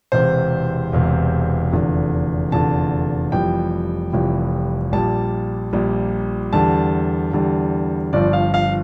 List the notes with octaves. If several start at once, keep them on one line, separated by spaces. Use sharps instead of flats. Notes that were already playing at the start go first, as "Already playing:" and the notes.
E1 E2 C3 C5
E1 E2 C3
F1 E2 D3
F1 E2 D3 A5
F1 F2 E3 G3 G5
F1 F2 E3 G3
A#1 A#2 G3 A5
A#1 A#2 G3
E2 D3 G3 A5
E2 D3 G3
G1 G2 F3 D5
F5
F5